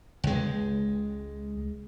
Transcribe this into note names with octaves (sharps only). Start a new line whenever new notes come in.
C#2 G#3